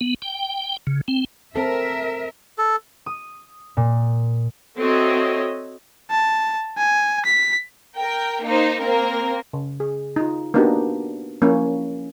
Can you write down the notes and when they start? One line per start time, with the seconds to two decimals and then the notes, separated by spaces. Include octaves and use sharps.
0.01 B3
0.22 G5
0.87 C#3
1.08 C4
1.56 C4 A4 A#4 E5
2.58 A4
3.06 D#6
3.77 A#2
4.77 C4 F#4 A4 C#5 D#5 E5
6.11 A5
6.78 G#5
7.25 B6
7.96 A#4 G5
8.44 A#3 D#4 C5
8.80 A#3 C4 A#4
9.53 C#3
9.80 G#4
10.16 D#4 F4
10.54 A#3 B3 D4 D#4 F#4 G4
11.42 F3 A#3 C#4 E4